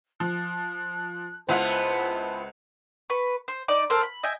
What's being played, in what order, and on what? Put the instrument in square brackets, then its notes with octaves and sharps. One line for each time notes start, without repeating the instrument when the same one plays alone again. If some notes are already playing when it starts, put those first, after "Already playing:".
[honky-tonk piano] F3 [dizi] F#6
[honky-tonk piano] C#2 F#5 F7 [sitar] B3 E4 F4 [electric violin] C5 [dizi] A5
[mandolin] B4 C#6
C5
D#4 D5 D6
A4 A#4 C5
B5
D#5 E5 G5 G#5